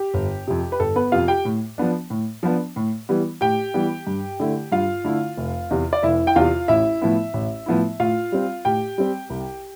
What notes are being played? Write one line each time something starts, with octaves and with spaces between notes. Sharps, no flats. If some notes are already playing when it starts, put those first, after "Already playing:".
Already playing: G4
G1
F2 C3
B4
G1 A4
B3 B4
F2 C3 F4 F5
G4 G5
A2
F3 B3 D4
A2
F3 B3 D4
A2
E3 G3 B3
A2 G4 G5
E3 G3 B3
G2
D3 A3 E4
G2 F4 F5
D3 A3 E4
F1
E2 C3
D5
F1 E4 E5
G5
E2 C3 F4 F5
A1 E4 E5
A2 F3 B3 E4
A1
A2 F3 B3 E4
A2 F4 F5
G3 C4
A2 G4 G5
G3 C4
C2